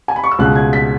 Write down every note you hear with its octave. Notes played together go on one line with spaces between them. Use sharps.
G#5
B5
C#6
E6
C#2 B2 G#3 F#6
G#6
B6